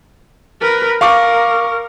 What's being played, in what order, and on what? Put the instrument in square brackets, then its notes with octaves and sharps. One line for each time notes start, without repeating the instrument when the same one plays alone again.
[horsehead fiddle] A#4 B4
[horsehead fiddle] A#4 [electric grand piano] F5 C#6 D6